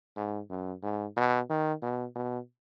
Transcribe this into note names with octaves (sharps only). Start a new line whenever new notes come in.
G#2
F#2
G#2
B2
D#3
B2
B2